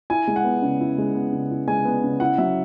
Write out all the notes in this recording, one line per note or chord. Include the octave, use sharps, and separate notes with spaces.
E4 G#5
G#3
F#5
B3
C#3
E4
G#3
B3
C#3
E4
G#3 G#5
B3
C#3
E4 F#5
F#3 E5